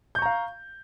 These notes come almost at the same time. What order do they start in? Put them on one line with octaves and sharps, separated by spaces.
G6 C#6 A#5 F5